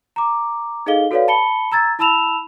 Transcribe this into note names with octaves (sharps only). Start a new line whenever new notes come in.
A#5 D6
D#4 G#4 A4 D#5 F5 G7
F#4 A4 B4 C#5 D5 F5
A5 B5 C#7 G7
A#5 E6 G#6 A6
E4 A5 B5 E6 E7 F7